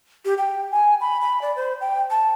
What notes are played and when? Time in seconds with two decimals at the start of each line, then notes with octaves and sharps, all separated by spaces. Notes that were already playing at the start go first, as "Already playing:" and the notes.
0.25 G4
0.38 G5
0.71 G#5
1.01 B5
1.21 B5
1.41 D5
1.56 C5
1.81 G5
2.10 A5